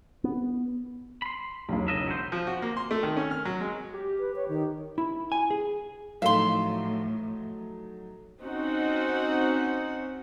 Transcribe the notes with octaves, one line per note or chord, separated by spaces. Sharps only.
B3
B5 C6
E1 B1
C#3 D#5 E5
F#3 C5
F3
F#4
A#3
C6
A3
D#3
C#4
F6
F#3
G#3
G4
B4
C#5
D#3
E4
G#5
G#4
A2 F3 F#3 A3 D#4 E5 F5 C6
C4 C#4 D#4 F#4 F#5